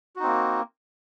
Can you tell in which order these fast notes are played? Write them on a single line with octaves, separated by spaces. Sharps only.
F#4 D#4 C4 A#3